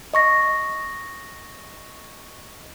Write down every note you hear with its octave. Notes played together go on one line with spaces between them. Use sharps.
D#5 C#6 A#6